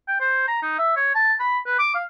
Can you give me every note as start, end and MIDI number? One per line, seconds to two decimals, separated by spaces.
0.08 0.16 79
0.20 0.46 72
0.48 0.60 82
0.62 0.75 63
0.78 0.94 76
0.96 1.14 73
1.15 1.33 81
1.39 1.58 83
1.66 1.78 71
1.79 1.90 86
1.95 2.03 77